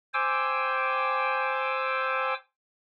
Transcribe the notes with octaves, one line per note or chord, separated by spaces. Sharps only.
C5 G5 G#5 D6 E6